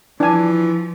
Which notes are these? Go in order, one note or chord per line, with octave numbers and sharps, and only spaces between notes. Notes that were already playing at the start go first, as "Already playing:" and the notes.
E3 F3 D4 G#5